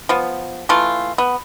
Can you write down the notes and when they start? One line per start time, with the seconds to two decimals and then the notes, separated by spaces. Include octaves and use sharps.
0.09 F3 B3
0.69 E3 A3 F4
1.18 B3